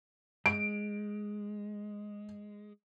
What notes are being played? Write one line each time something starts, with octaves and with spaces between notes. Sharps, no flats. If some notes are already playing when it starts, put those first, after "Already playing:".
G#3 D7